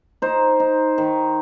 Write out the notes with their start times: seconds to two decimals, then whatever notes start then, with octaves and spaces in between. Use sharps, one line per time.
0.22 D#4 C5
0.60 D#4
0.98 D#3